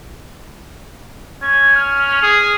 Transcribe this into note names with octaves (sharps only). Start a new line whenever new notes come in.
C#4 G#6
F6
G#4